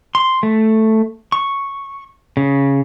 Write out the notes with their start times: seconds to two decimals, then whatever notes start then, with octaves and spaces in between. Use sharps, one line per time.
0.15 C6
0.43 A3
1.32 C#6
2.37 C#3